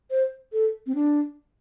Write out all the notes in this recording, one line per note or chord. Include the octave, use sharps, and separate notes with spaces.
C5
A4
C4
D4